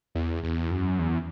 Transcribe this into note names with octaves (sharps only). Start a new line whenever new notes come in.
E2
E2
F#2
E2